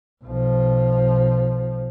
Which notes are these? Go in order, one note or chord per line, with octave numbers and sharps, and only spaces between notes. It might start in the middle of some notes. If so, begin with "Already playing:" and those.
B1 F3